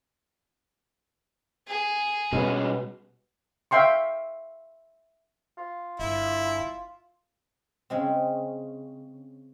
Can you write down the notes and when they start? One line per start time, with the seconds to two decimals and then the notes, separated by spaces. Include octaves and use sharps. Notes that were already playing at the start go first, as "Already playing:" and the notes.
1.67 G#4
2.33 B2 G3 G#3 B3 C#4
3.71 E5 F5 G5 C6 C#6
5.58 F4
6.00 G1 E4
7.90 C#3 G#3 C4